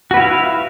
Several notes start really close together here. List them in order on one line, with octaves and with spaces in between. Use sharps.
F#4 B4 E4 F5